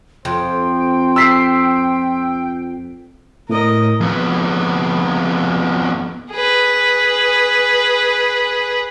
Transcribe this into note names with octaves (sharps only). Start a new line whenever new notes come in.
F2 C5 G5
E6 B6 C7
A2 A#4 D#5
F2 B3
G#4 B4